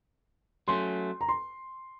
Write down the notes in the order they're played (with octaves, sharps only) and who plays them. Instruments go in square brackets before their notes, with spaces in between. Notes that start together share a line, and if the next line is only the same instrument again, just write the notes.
[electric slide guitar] F#3 A3 C#4 [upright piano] C6
[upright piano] A#5
C6